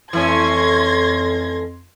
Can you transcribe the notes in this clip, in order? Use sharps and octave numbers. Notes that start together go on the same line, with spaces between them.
F2 E3 A3 C#4 C6 G#6 A#6